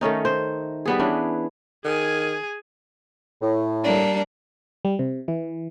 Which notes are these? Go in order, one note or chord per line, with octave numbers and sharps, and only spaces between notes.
D#3 A3 C#4 D#4
C5
G3 B3 G#4
E3 C#4 D4
D#3 G#4 G#5
A2
G3 A#3 D4
G3
C3
E3